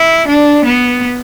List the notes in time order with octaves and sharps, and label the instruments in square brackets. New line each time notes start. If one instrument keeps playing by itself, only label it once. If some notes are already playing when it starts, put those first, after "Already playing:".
Already playing: [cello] E4
D4
B3